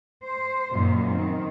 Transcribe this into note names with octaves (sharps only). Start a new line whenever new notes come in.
C5
F#2 A#2 D#3
D#3 C4